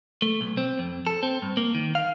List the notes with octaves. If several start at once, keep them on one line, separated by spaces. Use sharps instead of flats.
A3
B1
C4
F2
A4
C4
G2
A#3
D#3
F5